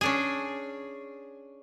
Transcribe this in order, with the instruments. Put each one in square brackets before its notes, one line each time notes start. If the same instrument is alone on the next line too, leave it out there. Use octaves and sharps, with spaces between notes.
[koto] C#4 D4 G#4